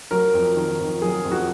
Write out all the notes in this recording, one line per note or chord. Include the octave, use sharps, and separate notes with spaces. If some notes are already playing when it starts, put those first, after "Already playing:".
F#3 A#4
F2
D#3
F2
F#3 G#4
F2
F#4